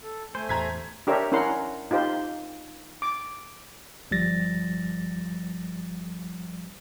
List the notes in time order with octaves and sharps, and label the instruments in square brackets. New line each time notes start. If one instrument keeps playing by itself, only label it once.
[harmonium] A4
[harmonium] A3 G#5 [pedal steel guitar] C5
[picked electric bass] E2 A2 [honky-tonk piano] A#5 G#6 B6
[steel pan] D4 G4 A#4 C#5 E5
C#4 E4 A#4 F#5 C6
D#4 F4 G4 C5
D6
[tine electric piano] G1 F3 G3 A6 A#6